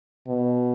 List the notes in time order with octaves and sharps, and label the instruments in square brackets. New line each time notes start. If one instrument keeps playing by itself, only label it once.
[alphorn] B2